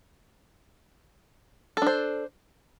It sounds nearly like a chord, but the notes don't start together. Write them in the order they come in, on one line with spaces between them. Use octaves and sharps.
A4 D4 C5